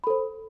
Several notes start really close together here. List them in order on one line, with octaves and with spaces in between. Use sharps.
B5 A4 C5